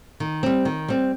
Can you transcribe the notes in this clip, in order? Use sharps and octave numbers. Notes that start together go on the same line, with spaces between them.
D#3
G3 C4
D#3
G3 C4